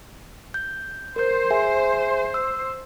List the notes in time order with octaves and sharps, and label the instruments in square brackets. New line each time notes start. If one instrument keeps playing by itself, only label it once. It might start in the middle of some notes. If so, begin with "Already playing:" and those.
[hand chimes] G6
[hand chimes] A#4 G6 [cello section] C5
[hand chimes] G#4 E5 G#5
E6